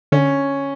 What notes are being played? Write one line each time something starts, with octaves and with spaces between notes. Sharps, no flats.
D3 C#4